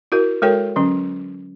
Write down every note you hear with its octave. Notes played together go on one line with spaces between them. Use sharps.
E4 F#4 A#4
G#3 F#4 A4 A#4 C#5 G5
D3 F#3 C#4